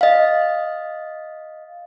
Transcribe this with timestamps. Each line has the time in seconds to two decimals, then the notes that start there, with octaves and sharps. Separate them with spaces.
0.01 D#5 F5